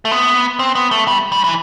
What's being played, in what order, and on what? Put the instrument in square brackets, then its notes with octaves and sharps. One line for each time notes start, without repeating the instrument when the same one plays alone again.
[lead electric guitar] A3
B3
C4
B3
A3
G3
G3
E3